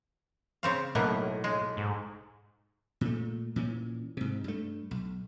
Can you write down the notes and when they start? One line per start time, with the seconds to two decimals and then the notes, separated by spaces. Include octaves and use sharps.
0.63 C#3 C4 F5
0.95 B1 A2 A#3 B3
1.44 G#3
1.77 G#2
3.01 A#2 A3
3.56 A#2 E3 C#4
4.17 G#2 C3
4.44 G2 A3
4.91 B1